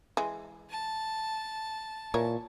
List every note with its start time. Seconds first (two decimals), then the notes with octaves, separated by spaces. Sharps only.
0.17 E3 G#3
0.70 A5
2.14 A#2 E3 A#4 C#5